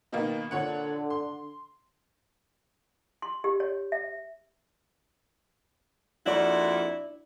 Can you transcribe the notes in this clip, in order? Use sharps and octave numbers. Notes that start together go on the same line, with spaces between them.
B2 D#3 A#3
A#2 D3 C#5 F#5
C6
C6
G4
C#5
E5
F2 A#2 D4 E4 F#4 D5